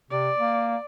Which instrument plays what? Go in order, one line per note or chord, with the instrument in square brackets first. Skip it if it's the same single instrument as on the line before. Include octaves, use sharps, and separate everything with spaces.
[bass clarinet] C3 [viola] D5
[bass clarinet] A#3